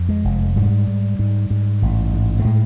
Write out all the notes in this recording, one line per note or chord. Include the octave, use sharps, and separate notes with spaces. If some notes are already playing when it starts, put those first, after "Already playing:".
Already playing: F2
G#3
F1
G#2 G3
G#2
G#2
G#2
A1
G#2
A3
A2 G#3